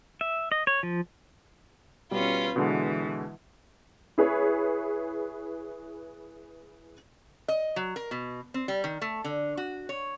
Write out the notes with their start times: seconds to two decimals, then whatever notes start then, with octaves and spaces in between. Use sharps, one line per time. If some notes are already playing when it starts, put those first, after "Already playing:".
0.21 E5
0.52 D#5
0.67 C#5
0.83 F3
2.11 B2 G3 C#4 F4 B4
2.56 B2 D3 E3 G#3
4.18 E4 G#4 B4 C#5
7.48 D#5
7.76 F#3
7.96 A#4
8.11 B2
8.54 C4
8.68 G3
8.84 D#3
9.01 A3
9.24 D3
9.57 F#4
9.89 C#5